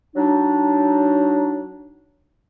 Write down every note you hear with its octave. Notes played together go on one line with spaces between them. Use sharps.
F#3 D4 D#4